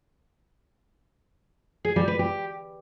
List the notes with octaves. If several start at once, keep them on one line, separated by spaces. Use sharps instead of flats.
G#4
G3
B4
G4